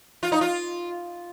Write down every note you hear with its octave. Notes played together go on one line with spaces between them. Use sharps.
F4
D#4
F4